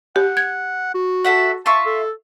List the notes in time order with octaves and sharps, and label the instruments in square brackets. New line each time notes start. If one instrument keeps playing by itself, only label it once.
[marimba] G4 [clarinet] F#5
[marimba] G#6
[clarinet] F#4
[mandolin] A4 E5 F#5
[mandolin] F4 E5 C#6 [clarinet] A5
[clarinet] A4